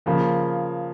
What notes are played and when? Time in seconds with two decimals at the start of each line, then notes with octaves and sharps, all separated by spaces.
0.06 C#3 F3 A#3